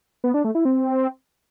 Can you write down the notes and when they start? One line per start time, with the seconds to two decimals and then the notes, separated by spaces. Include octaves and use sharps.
0.24 B3
0.34 D4
0.44 A3
0.55 E4
0.65 C4